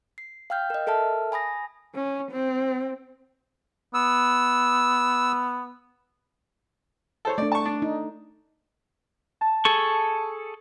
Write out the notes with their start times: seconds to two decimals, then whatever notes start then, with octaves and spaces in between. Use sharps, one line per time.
0.18 C7
0.50 F5 G5 F6 G6
0.70 A#4 D#5
0.87 A4 A#4 E5 A5 F6
1.32 G#5 B5 D#6 A#6
1.95 C#4
2.32 C4
3.94 B3 E6
7.25 A4 C5 C#5
7.38 A3 D4 D5
7.52 A5 C#6
7.65 D4
7.82 D#4
9.41 A5
9.65 G#4 A4 C#6